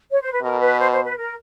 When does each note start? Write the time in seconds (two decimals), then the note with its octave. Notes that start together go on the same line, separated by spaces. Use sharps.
0.11 C#5
0.21 C5
0.32 B4
0.42 B2 A#4
0.61 B4
0.79 C5
0.92 C5
1.04 B4
1.17 A#4